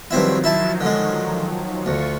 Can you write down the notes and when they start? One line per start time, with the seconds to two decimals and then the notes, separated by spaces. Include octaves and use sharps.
0.11 G2 D#3 F3 F#3 C4 E4
0.44 E4 A5
0.81 D3 G#3
1.86 D2 F4 C#6